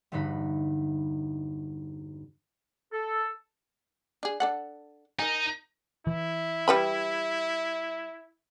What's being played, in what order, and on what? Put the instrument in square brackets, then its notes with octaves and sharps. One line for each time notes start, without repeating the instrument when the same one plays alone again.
[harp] E1 G2 D3 D#4 B5
[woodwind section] A4
[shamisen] D4 G#4
D4 A4 F#5
[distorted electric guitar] D#4 [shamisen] A#4 G#5
[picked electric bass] E3 [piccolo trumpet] E4
[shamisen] G3 B4 B5